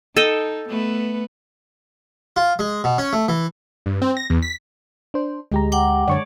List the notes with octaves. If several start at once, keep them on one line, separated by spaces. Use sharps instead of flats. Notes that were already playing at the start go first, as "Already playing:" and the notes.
D#4 A4 D#5 G5
A3 B3 B4
F4
G#3
B2
C#4
A3
E3
G2
C4
A#6
E2
B6
D4 C5
D2 G#3 G4 A#5
F#5 G5 D6
F#2 D3 C#5 D5 C#6